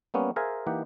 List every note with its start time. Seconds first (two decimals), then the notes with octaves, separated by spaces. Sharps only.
0.14 G3 A#3 B3 C#4
0.36 G#4 A#4 C5 E5 F5 G#5
0.67 E3 A#3 D#4 G4 F#5